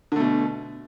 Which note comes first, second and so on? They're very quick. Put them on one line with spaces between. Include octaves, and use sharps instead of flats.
D3 A3 B2